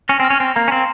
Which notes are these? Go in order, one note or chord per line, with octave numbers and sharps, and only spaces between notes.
C#4 A#6
C4
F6
C#4
C4 F6
A#3 A#5
C#4
C4 C6